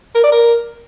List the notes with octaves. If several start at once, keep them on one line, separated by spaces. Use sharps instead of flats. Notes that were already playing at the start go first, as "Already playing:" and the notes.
A#4
D5
A#4